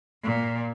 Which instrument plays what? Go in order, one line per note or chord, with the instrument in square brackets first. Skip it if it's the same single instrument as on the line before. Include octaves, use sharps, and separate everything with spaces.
[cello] A#2